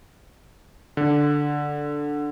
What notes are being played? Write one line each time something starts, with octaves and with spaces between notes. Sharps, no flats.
D3